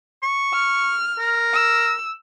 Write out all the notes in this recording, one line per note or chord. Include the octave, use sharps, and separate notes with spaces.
C#6
F6
A#4
E6